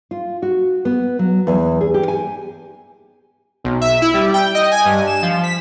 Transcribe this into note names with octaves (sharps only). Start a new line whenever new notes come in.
F4
F#4
B3
F#3
E2
G#4
G4
G#5
B1
E5
E4
G3
G5
D#5
G#5
G2
E7
F3
B6